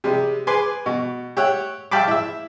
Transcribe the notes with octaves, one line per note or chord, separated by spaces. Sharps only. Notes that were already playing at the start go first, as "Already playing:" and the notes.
C3 G3 G#3
G#4 B4 G#5 C6 D6
B2
G4 C#5 E5 F#5
E5 F5 G5 A5 B5 D6
E4 E5